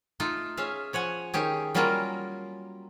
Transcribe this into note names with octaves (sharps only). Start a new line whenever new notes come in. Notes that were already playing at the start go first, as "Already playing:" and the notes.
A3 D#4 F4
C#4 G#4 E5 F5
F3 C#5 F#5 G#5
D#3 C#4 G4 G#4
F#3 G3 A#3 C#4 F4 A#4